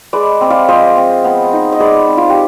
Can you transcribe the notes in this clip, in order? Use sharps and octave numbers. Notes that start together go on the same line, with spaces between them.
G#3 B4 D5
C4
D5 F5
F3 C5 D#5
C4
B3
D#4
D#5
G#3 B4 D5
C4
F4
G4